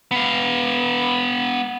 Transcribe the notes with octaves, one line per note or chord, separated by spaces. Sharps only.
B3 F5